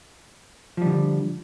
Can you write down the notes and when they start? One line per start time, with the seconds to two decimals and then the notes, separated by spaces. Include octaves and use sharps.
0.77 F3
0.82 G3
0.86 D3